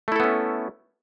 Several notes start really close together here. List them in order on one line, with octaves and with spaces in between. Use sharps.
A3 E4 A4 B3 C#4